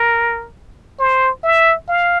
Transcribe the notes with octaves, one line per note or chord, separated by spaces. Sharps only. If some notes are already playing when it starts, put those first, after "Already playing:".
Already playing: A#4
C5
E5
F5